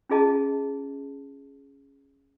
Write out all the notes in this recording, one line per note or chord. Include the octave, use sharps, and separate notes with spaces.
C#4 E4 F4 G#4 D#5 A5